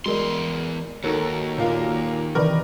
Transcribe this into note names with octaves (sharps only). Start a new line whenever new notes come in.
E2 G#3 F#4 A#4 D5 C6
D#2 D#4 F#4 A4 A#4 C#5 A#5
A#2 F4 A#4 C#5
C3 D#3 E3 A#4 B4 D5 C#6 F6